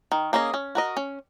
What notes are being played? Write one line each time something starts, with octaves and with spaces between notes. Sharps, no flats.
D#3
A#3 C#4 G#4 D#5
C#4
F#4 A#4 D#5
C#4